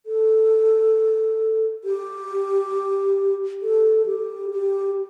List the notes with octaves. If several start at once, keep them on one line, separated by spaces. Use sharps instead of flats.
A4
G4
A4
G4
G4